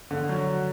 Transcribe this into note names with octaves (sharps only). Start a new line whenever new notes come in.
D3
F#3